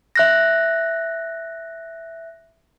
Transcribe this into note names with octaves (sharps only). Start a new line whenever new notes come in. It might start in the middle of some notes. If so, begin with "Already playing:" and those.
E5 F#6 A#6